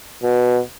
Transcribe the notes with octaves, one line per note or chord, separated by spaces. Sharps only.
B2